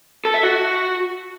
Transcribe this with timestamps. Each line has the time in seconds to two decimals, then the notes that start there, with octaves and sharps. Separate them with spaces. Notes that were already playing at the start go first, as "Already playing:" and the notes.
0.25 A4
0.34 E5
0.43 F#4